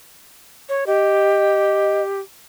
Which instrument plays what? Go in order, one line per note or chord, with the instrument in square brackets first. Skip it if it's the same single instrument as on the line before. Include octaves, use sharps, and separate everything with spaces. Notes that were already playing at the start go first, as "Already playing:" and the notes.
[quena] C#5
[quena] G4 [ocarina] D#5